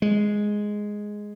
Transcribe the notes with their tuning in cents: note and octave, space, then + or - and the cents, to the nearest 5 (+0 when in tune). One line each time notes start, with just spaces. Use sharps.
G#3 +0